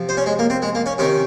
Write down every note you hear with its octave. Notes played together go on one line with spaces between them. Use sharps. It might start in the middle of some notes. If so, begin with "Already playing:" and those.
Already playing: C3 F3
C5
C#4
G#3
A#3
C4
G#3
A#3
C#4
C3 D#3 C#4